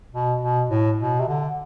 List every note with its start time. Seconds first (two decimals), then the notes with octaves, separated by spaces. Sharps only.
0.13 B2
0.41 B2
0.70 A2
0.99 B2
1.20 C3
1.27 D3